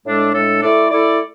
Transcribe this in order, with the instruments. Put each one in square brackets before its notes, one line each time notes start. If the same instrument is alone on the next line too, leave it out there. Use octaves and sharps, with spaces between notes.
[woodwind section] A2 G#3 D4 A4
A2 G#3 D4 A4
A3 E4 A4 D5
A3 E4 A4 D5